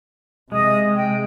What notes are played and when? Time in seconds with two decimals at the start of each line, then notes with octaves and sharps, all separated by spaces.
0.52 C3 G#3 D#5 D#6
0.95 G5